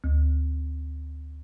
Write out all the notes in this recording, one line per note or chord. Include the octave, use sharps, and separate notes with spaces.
D2